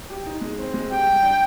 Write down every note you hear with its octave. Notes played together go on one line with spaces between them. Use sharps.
G4
D#4
G#3
C4
G#3
G4 G5
G3
D4